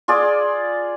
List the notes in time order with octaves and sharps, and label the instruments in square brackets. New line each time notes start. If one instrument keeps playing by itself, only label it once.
[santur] F4 G#4 D5